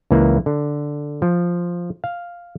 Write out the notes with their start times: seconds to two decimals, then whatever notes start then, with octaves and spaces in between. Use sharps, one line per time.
0.11 C#2 E3 A#3
0.46 D3
1.22 F3
2.04 F5